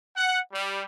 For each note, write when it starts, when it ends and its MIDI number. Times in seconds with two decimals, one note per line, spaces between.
0.15 0.38 78
0.53 0.83 55